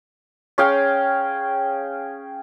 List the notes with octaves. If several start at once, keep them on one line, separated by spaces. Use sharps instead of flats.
C#4 G#4 F5 G5